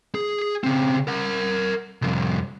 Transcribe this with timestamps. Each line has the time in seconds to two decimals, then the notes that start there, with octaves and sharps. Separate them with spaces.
0.15 G#4
0.64 C#3 C4
1.07 A#4 F#5
2.02 C2 F2